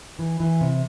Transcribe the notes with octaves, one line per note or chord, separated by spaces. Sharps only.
E3
E3
C3